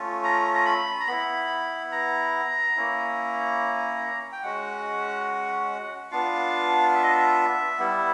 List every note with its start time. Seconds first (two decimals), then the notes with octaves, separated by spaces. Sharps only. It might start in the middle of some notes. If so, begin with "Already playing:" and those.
Already playing: A3 C#4 F4
0.24 A#5
0.54 A#5
0.66 B5
1.00 A#5
1.07 B3 E4 B5
1.92 A#5
2.76 A#3 C#4 E4
4.32 G5
4.43 G#3 C#4 F#4 F#5
6.11 B3 D4 F4 F5
6.95 E5
7.03 D#5
7.11 E5
7.79 G3 B3 E4